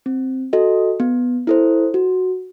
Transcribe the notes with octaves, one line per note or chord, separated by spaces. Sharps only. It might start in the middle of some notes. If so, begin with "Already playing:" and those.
C4
F#4 A4 D#5
B3
E4 A4 C5
F#4